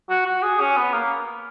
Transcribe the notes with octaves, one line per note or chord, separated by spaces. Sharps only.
F#4
F#4
G#4
C#4
B3
A#3